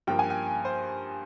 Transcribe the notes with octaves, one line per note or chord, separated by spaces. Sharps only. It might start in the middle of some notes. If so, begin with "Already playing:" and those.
G2 F3 A#3 G5
G#5
G5
C5